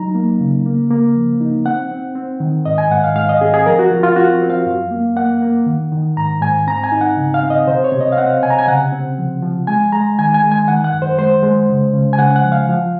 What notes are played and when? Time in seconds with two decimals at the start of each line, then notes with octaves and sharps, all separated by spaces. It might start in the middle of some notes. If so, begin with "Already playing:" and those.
Already playing: F#3 D#4 A#5
0.15 A#3
0.40 C#3
0.65 A#3
0.90 A#3
1.16 F3
1.40 D#4
1.66 C4 F#5
1.91 C4
2.15 C4
2.40 D#3
2.65 G#2 D#5
2.78 G#5
2.91 G#2 F#5
3.04 F5
3.16 G#2 F5
3.29 D#5
3.41 C4 G#4
3.54 G#4
3.66 F3 A#4
3.79 F#4
3.91 F3 F4
4.03 F4
4.16 C4 F#4
4.42 C4
4.50 F5
4.66 F#2
4.91 A#3
5.16 A#3 F#5
5.42 A#3
5.66 D#3
5.92 D#3
6.17 G#2 A#5
6.41 G#2 G#5
6.67 C4 A#5
6.84 G#5
6.92 D#4
7.01 F#5
7.17 C#3
7.34 F5
7.43 C4
7.50 D#5
7.67 C3 C5
7.84 C#5
7.92 C3
8.00 D#5
8.12 F5
8.17 C4 F#5
8.42 C3 G#5
8.50 A#5
8.59 G#5
8.68 C#3 F#5
8.92 C4
9.18 F3
9.42 F3
9.67 G#3 G#5
9.92 G#3 A#5
10.19 D#3 G#5
10.34 G#5
10.43 G#3
10.52 G#5
10.68 D#3 F#5
10.84 F#5
10.93 F#2
11.02 C5
11.18 G#3 C5
11.43 G#3
11.69 C#3
11.94 C#3
12.13 G#5
12.19 C#3 F#5
12.36 F#5
12.44 F3
12.52 F5
12.69 F3